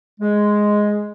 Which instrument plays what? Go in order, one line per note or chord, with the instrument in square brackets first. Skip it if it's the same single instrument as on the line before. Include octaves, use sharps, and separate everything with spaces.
[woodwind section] G#3